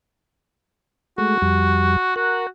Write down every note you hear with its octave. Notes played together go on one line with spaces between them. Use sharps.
G#3 A3 F#4
F2 G3
F#4 A#4 F#5